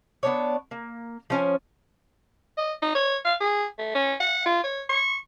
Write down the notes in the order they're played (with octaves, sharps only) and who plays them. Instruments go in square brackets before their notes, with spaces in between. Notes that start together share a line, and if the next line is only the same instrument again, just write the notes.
[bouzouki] B3 D4 C#5
A#3
F3 C#4 G#5
[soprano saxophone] D#5
D#4
C#5
F5
G#4
A3
C#4
F#5
F4
C#5
C#6